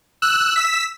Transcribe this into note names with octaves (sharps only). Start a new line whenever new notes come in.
E6 F#6
E6 B6